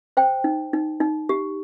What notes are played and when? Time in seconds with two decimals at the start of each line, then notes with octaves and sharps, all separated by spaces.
0.17 C5 G5
0.44 D#4
0.73 D#4
1.00 D#4
1.29 G4